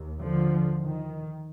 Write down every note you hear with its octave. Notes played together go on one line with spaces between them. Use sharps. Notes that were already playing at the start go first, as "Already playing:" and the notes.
Already playing: D#2
D3 F3
D#3